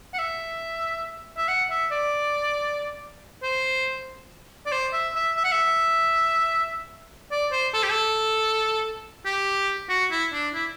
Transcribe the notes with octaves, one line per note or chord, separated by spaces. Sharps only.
F#5
E5
E5
F#5
E5
D5
C5
D5
C5
E5
E5
E5
F#5
E5
D5
C5
A4
G4
A4
G4
F#4
E4
D4
E4